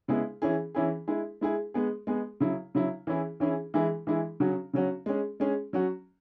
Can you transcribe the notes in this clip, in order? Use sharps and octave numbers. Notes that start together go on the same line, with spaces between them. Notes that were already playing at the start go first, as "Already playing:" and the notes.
C#3 G#3 B3 E4 G#4
E3 C#4 E4 G#4
E3 C#4 E4 G#4
G#3 E4 G#4
G#3 E4 G#4
G#3 B3 G#4
G#3 B3 G#4
C#3 F#3 E4
C#3 F#3 E4
E3 C#4 E4 G#4
E3 C#4 E4 G#4
E3 G#3 E4 G#4
E3 G#3 E4 G#4
C#3 F#3 C#4 F#4
C#3 F#3 C#4 F#4
G#3 C#4 G#4
G#3 C#4 G#4
F#3 C#4 F#4